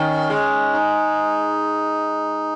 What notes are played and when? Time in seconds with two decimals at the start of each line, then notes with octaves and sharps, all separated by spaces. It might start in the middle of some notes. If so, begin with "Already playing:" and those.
Already playing: D#3 C#4
0.30 G#3
0.73 D#4